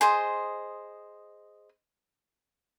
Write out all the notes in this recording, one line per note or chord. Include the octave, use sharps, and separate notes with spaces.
G#4 C5 D#5 C6